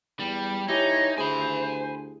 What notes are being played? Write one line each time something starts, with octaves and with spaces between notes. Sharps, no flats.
E2 G3
E3 D#4 E4 G4 C#5 G#5
D2 G#4 C5 G#5 B5